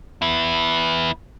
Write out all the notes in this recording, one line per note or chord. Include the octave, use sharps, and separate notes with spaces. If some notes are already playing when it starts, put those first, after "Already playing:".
B3 E4